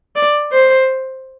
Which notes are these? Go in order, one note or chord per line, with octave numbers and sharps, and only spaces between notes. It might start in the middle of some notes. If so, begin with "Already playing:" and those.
D5
C5